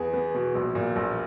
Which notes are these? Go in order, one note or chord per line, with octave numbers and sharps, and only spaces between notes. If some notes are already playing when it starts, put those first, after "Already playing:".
Already playing: E2 B3 G#4
B3
B2
A#1
A#2
A#1